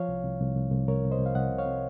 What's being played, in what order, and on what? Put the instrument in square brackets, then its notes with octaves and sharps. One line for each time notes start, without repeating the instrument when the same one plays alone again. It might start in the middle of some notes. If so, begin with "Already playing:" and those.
Already playing: [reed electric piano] F3 C#5 F5
C2
C2
C2
C2
C2
C2 A#4 C#5
C2
C5 D#5
C2
F5
C2 D#5 F#5
C3
C#5 F5
C3